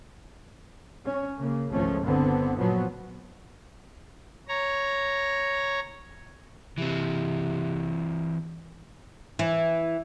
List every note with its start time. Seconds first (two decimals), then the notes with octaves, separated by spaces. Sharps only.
1.05 C#4
1.39 C#3 A#3
1.71 G#1 C#2 F3 A3 C#4
2.04 G1 D3 B3 C4
2.57 A#2 F3 F#3 B3
4.48 C#5 A#5
6.78 C3 E3 C4
9.39 E3